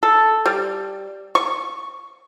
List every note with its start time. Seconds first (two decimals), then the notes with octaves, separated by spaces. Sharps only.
0.03 A4
0.46 G3
1.35 C#6